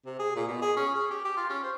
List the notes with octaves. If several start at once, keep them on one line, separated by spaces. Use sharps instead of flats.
C3
G#4
A#2
B2
G#4
C#4
G#4
G4
G4
F4
C#4
C5